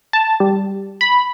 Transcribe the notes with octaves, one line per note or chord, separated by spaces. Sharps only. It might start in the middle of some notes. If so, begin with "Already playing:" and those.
A5
G3
B5